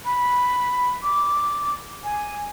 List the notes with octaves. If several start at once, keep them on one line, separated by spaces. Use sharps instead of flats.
B5
D6
G#5